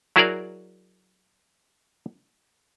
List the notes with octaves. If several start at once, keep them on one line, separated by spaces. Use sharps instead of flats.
F#3 E4 F#4 G#4 A#4 D5